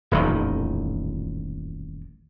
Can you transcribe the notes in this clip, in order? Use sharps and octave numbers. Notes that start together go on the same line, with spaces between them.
D#1 A1 F2 D#3